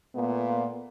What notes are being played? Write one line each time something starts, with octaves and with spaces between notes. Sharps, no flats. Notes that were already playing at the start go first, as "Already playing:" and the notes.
A#2 A3 B3